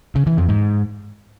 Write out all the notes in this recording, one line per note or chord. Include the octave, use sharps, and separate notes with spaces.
C#3
E3
F2
G#2